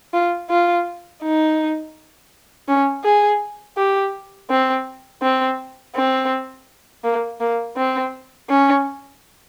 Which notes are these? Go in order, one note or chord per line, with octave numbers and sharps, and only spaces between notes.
F4
F4
D#4
C#4
G#4
G4
C4
C4
C4
A#3
A#3
C4
C#4